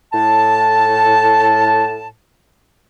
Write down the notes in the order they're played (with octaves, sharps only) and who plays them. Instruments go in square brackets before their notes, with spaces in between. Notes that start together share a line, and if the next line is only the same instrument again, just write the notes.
[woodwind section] A2 A5